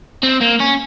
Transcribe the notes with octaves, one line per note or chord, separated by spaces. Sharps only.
C4
A#3
C#4